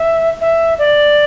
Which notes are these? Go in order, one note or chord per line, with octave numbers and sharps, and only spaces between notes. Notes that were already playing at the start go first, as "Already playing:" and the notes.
Already playing: E5
E5
D5